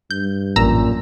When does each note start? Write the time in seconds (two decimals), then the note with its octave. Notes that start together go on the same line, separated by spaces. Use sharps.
0.11 G2 G6
0.56 A1 F#2 A#2 A#5 E6